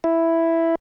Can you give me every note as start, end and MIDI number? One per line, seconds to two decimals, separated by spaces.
0.04 0.75 64